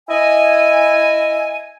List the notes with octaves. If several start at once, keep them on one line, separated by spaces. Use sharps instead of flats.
E4 D#5 G#5